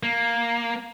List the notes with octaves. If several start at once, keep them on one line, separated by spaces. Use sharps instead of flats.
A#3